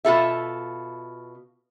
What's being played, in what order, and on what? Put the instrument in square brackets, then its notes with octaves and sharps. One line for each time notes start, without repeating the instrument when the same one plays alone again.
[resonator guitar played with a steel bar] B2 F4 A4 E5